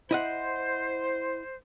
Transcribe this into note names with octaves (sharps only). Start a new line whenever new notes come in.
E4 C5 D#5 F#5